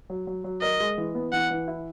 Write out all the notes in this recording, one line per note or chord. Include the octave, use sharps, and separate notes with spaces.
F#3
F#3
F#3
A#4 D#5
G#3
E3
B3
E3 F#5
E3
E4